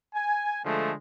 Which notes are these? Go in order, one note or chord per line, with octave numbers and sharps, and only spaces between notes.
G#5
D3 F3 G#3 A3